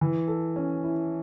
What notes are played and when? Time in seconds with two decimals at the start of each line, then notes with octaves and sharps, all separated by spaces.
0.01 E3
0.28 A4
0.56 C#4
0.84 E4